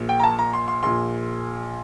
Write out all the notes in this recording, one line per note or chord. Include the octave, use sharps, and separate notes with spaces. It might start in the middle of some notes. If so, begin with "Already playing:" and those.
Already playing: A#1 A#2
G5
A#5
A5
A#5
C6
C6
A#1 A#2 C6